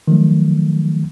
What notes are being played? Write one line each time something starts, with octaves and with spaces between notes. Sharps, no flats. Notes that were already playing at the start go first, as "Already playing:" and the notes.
D#3 F3 F#3 A3